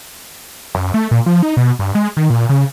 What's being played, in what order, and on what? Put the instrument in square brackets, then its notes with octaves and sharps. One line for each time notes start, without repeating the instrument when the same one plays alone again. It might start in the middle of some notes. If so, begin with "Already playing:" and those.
[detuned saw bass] F#2
A3
A#2
F3
D#4
B2
G2
G#3
D#3
A#2
C#3